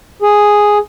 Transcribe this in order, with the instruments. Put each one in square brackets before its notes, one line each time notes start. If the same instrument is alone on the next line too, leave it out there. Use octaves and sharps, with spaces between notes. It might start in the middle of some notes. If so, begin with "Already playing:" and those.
[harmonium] G#4